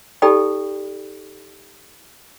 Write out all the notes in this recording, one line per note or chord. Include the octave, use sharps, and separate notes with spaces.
D#4 G4 A4 D5 G5 B5